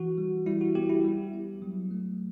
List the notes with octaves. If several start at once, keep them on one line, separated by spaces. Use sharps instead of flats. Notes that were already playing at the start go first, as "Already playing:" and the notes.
Already playing: E3 F#4
G3
G3 E4
F#4
B3 G4
E4
G3
B3
F#3
A3